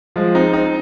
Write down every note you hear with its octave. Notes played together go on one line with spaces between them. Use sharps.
F3 G#3
C4 D#4
C4 D#4